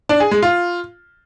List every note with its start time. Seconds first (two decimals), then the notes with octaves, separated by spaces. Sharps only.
0.09 D4
0.20 G#4
0.31 G#3
0.42 F4